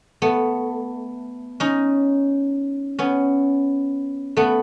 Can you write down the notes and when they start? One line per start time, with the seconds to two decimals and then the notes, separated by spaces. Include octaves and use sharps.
0.22 A3 B3
1.60 C#4 D#4
2.99 B3 C#4
4.37 A3 B3